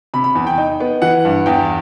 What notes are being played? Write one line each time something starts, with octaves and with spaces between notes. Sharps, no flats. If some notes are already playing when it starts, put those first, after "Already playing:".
C3 B5
B5
E2
G5
D#4
B3
E3 F#5
G2
E2 G5